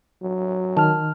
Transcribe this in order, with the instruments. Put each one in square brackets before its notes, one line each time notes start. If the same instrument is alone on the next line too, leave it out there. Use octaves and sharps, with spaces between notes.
[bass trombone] F#3
[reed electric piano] D#3 F6 [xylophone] A5